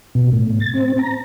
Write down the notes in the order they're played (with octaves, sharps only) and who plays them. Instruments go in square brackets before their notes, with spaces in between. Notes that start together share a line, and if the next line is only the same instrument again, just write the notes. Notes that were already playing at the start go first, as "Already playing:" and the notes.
[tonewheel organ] B2
A2
A6
C4
A#5